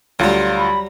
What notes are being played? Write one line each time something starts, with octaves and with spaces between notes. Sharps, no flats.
D2 F#3 G3 F4
B5